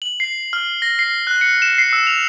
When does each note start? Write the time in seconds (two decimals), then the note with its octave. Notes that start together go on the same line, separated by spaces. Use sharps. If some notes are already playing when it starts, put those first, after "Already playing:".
0.02 F#7
0.20 C7
0.53 F6
0.82 A#6
0.99 C7
1.27 F#6
1.41 C#7
1.62 E7
1.78 C7
1.93 E6
2.07 F7